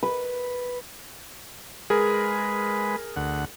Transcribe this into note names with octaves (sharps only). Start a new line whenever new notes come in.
B4
G#3 G#4 A#4 B4
D2 F#5